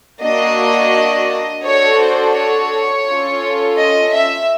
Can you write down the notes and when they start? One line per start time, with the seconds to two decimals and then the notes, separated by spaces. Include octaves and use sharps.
0.21 A#3 D4 F#4 D#5
1.63 D4 F#4 A4 C#5
1.99 C5
2.34 C#5
3.05 C#4 F4 A4
3.76 D#5
4.11 E5